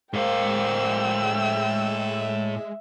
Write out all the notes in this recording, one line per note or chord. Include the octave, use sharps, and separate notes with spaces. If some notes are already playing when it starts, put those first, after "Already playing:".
A2 G#3 A#3 C5 F5 G5 E6
E5